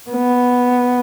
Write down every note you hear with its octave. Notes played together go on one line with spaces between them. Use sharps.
B3